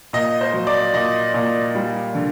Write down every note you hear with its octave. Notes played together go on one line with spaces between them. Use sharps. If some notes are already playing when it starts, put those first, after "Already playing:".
A#2 D#5
C5
F#3
D5
A#2 D#5
A#2
G3
D3